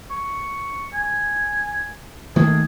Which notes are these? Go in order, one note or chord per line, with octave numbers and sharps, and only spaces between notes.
C#6
G#5
D#3 A3 A#3 G#4